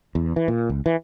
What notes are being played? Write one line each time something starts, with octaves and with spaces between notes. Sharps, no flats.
E2
E3
A#2
C#2
E3